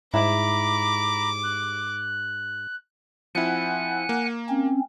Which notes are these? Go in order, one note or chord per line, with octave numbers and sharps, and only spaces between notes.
G#2 G3 E4 A#5 B5 D6
F#6
F3 C4 E4 F#5 G#5 F#6
A#3
C4 C#4